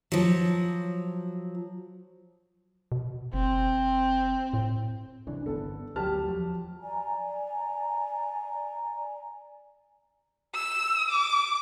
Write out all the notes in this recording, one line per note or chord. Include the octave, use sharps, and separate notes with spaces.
F3 F#3
B2
F#1 C4
A2
C2 C#3 E3 D4
G1 B3 A4
D2 F#3 G4 A5 F6
E2 F3 F#3
D5 G#5 A#5
E6
D6